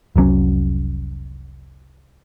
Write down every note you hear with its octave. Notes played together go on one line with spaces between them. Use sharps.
F1 C2 F#3 C#4